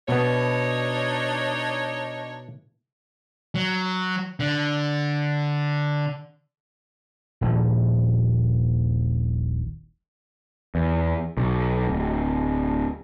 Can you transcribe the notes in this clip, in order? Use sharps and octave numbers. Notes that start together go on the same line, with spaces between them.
B2 B3 D4 D#4 C#5
F#3
D3
D#1 A#1 D#2 F3
E2
B1
D1